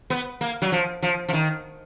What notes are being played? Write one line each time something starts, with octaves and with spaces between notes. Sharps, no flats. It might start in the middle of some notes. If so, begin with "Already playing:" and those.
B3
A#3
F#3
F3
F3
F3
D#3